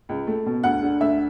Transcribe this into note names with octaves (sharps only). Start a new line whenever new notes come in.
C#2
A3
B2
D2 F#5
D3
D2 E5